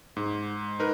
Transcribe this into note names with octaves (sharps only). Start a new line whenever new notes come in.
G#2
D#4 A#4 B4